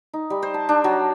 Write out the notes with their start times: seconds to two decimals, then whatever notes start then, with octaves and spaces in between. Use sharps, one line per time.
0.13 D#4
0.30 G3
0.42 C5
0.54 A5
0.69 D4
0.84 F#3